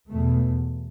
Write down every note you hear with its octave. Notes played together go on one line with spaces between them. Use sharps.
E2 B2 A3